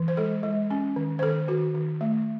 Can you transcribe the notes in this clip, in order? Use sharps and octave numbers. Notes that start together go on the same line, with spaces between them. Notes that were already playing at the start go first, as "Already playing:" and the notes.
Already playing: E3
C5
G#3 A4
G#3
C#4
D#3
C5
D#3 A4
D#3 F#4
D#3
A3